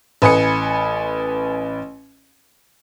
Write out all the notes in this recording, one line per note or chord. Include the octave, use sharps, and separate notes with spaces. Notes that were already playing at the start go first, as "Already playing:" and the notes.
A1 B4 G#5 D#6 C#7